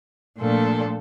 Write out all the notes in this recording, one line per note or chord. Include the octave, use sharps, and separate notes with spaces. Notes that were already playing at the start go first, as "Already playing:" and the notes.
A#2 F3 A3 D4 A4